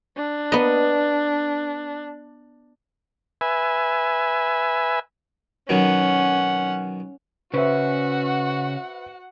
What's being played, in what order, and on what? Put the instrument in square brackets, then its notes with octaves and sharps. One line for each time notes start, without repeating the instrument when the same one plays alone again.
[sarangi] D4
[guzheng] B3 D#5
[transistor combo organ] B4 E5 G#5
[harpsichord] B2 D#3 F#3 [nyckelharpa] C#4 F#5
[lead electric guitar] C#3 C#4 [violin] F#4 F#5 [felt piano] B4 C5 E5